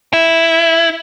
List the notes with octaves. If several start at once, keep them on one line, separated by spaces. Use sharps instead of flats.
E4